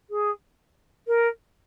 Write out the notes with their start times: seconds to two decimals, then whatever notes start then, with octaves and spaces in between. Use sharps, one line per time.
0.10 G#4
1.07 A#4